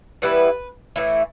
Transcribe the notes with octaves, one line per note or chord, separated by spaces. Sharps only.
E3 G3 B3 E4 B4
A2 E3 A3 E4